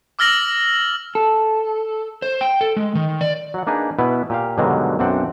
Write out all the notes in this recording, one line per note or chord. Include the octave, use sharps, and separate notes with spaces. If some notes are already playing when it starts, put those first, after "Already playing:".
D6 E6 F6 A6 A#6 F#7
A4
C5
G5
A4
G#3
D#3
D5
F#3 F#5
A#3 D4 D#4 G#4 B4
B2 B3 E4 B4
A#2 G4 F5
G2 B2 D3 D#3 F#3 G#3
B1 F#2 C4 D4 F#5 G5